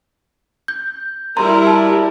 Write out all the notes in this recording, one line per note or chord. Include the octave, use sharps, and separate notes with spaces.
G6
G3 E4 A#4 A#5 C6
A5